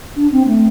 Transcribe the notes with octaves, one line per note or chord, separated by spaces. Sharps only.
D4
C4
A3